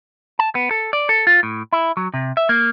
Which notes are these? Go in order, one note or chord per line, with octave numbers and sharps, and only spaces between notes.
A5
B3
A4
D5
A4
F4
A2
E4
F#3
C3
E5
A#3